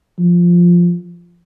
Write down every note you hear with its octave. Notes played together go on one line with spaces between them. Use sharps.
F3